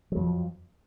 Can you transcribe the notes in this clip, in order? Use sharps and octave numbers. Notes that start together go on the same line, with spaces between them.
F2 F3 F#3